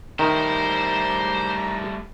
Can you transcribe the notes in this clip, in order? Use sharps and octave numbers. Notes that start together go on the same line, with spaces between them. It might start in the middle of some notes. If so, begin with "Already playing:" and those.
D#3 G3 A3 E4 C5 A#5 C6